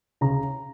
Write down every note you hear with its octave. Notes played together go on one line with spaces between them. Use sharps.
C#3 A#5